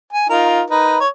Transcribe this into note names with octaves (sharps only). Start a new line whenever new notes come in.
G#5
D#4 F4 A#4
D#4 A#4 B4
C#5